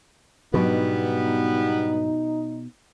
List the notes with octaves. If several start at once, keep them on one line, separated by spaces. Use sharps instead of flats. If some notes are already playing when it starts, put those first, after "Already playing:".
G#2 B2 F#3 G3 B3 D4 D#4